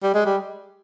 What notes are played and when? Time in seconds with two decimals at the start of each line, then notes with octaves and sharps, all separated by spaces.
0.03 G3
0.14 G#3
0.26 G3